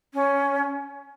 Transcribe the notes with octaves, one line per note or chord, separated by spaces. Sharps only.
C#4